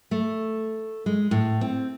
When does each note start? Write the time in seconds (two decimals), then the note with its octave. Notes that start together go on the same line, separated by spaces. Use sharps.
0.11 A3
1.06 G#3
1.31 A2
1.61 C4